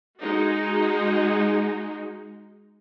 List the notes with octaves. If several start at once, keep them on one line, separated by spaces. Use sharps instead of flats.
G#3 D#4 F#4